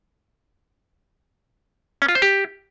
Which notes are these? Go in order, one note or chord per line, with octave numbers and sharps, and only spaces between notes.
C#4
F4
C5
G4